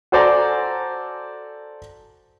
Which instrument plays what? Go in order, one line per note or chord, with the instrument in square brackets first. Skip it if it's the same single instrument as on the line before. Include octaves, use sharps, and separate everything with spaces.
[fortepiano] F#4 A4 C5 D5 G#5 A#5